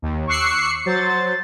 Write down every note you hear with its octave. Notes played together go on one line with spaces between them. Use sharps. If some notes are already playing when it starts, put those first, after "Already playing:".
D#2
C#6 D6 E6 F#6 C7 C#7
F#3 C5 A6